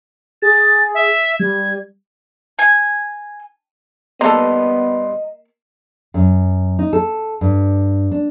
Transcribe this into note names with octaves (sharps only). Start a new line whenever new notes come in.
G#4 A6
E5
G3 G#6
G#5
G3 A#3 B3 A4 B4 D#5 A#5 C6
F#2
D#4
A4
G2
D4